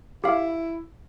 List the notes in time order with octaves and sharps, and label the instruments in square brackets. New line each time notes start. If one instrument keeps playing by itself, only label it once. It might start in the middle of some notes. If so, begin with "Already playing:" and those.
[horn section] E4 [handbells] G4 F5